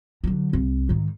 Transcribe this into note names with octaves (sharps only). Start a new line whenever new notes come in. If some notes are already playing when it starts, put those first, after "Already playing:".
D3 F#3
C2
G#2 D#3